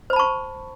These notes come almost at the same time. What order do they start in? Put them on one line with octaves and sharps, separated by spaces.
C5 B5 A5 C#6